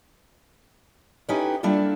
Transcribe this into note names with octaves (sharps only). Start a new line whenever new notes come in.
C#4 D#4 E4 G4 A4 B4
G3 A#3 D4 E4 F4 A4